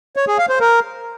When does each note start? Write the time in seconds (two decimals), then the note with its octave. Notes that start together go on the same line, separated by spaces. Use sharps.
0.16 C#5
0.27 G#4
0.38 F5
0.49 C5
0.60 A#4